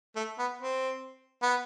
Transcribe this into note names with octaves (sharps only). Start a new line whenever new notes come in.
A3
B3
C4
B3